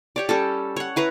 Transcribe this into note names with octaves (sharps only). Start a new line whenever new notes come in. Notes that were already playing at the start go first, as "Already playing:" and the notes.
G4 C#5 D5
G3 C#4 A4
C#5 F#5
E4 B4 C#5 A#5